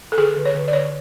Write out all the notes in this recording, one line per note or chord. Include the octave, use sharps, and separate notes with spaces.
A4
D3 G#4
D3
C#5
D3
D5
D3 C#5